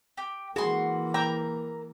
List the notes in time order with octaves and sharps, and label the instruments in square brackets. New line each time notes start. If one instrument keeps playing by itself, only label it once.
[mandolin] G4
[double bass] E3 A#3 [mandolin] F#4 F#5 C6 [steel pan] G#4
[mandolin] A#4 A#5 E6 [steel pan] G5